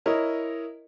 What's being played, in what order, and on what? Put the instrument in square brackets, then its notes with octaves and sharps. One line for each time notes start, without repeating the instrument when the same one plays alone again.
[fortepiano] E4 A#4 C#5 D#5